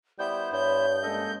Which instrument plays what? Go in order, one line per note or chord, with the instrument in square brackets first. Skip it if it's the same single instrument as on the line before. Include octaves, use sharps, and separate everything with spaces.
[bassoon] G3 [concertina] B3 E4 C5 [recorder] G6
[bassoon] G2 [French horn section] C#5 [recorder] G6
[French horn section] G#3 A#3 C#4 [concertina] A4 D#5